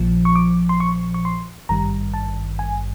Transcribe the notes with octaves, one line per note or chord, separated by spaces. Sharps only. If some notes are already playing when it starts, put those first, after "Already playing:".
Already playing: A#1 A#2 F3
C#6
D6
C6
C#6
C#6
C6
G#1 G2 D#3 G3 A#5
A5
G#5